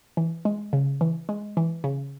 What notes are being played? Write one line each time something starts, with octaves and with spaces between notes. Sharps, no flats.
E3
G#3
C#3
E3
G#3
E3
C#3